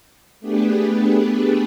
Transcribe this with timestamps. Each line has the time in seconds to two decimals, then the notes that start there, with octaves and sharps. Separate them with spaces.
0.40 A3 B3 D4 G4 G#4 B4